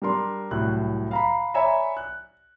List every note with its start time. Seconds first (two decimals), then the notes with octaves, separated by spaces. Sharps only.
0.02 G3 D4 A#4 C6
0.51 C2 A2 F#3 F#6
1.11 F5 A#5 B5
1.54 C#5 D5 E5 G#5 A#5 B5
1.97 F#6